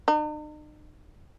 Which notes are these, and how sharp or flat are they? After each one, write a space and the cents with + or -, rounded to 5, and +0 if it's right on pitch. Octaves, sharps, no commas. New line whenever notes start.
D#4 -45